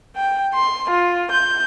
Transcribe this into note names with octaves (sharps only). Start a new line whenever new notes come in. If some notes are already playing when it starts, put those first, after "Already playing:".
G5
C6
F4
G6